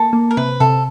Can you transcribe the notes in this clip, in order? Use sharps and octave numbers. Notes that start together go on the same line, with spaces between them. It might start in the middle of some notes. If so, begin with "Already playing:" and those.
Already playing: A#3 A4
A#3
A#4
C3 B4
C3 A4